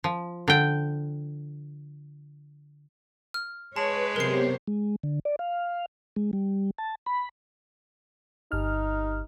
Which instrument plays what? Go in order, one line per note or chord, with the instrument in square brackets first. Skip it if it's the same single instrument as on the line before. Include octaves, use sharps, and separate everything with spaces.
[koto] F3
D3 G5
[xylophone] F6
[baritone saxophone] G#3 [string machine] B4 [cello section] C#5 [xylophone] A5
[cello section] C3 F#3 C5 [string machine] B3 G4 C#5 [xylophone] A#4 C7
[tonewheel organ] G#3
D3
D5
F5
G#3
G3
A5
B5
[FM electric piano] G1 F6 [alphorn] D#4